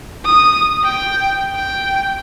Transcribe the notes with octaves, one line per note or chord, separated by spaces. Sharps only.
D#6
G5
G5